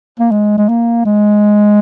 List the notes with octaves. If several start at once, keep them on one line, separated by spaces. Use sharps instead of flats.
A#3
G#3
G#3
A#3
G#3